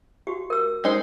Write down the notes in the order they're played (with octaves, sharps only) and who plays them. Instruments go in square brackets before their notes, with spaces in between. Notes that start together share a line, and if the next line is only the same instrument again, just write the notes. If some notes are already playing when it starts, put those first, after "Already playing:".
[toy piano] F#4 G4
A#4 E6
[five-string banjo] G#3 D#4 C5